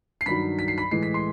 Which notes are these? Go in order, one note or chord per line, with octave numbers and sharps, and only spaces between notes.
C7
G2 D#3 F#3 B5 B6
B6
C7
B5 B6
A2 E3 G#3 C7
B6
C6 C7